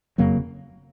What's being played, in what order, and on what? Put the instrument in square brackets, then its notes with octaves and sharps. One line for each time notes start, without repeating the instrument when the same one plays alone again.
[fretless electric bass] F#1 F2 C#3 F#3 A#3